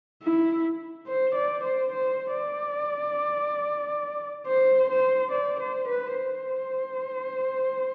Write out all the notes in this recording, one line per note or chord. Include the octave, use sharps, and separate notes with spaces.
E4
C5
D5
C5
C5
D5
C5
C5
D5
C5
B4
C5